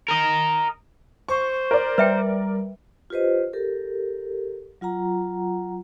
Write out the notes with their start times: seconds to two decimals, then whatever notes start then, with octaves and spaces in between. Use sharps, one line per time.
0.08 A#4 D#5
1.28 C5 C#6
1.71 A#4 D5
1.98 G3 B4 E5 G5
3.10 F4 G4 B4 C5 D#5
3.53 G4 A4 A#4
4.81 F#3 F4 F#5 A#5